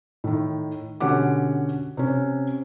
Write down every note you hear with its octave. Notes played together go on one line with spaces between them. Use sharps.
A2 D#3
B2 D3 C#4 G4 F#5 D6
C3 C#4